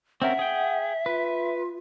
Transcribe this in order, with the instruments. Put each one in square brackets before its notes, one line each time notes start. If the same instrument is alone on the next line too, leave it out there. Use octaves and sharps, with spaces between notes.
[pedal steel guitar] C4 C#4 A#4 [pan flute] E5 [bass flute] F#5
[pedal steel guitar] G#4 G5
[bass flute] F4 [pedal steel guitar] B4